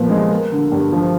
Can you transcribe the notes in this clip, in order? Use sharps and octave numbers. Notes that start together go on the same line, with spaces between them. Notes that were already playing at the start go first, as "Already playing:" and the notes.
Already playing: A#2 F3 B3
G#3
A#3
D3
G2
F3